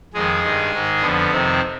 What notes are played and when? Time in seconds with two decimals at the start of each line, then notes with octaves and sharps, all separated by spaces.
0.14 F2 D#3 G#3 G#4
0.43 G2 D#3
0.73 G#2 D#3
1.02 F2 D3 F3 B3
1.31 F2 C3 D#3 C4